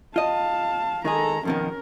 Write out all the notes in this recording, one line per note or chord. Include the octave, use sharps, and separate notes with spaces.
F4 D#5 F5 A5
D#3 G#3 G#4 A4 A#5
F2 B2 D#3 C#4 A#4